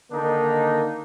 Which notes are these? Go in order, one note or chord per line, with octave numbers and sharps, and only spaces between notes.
D3 D#3 A#3 D4 D#4